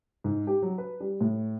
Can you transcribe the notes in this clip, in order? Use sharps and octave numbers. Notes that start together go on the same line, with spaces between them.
G#2
G4
F#3
B4
G3
A2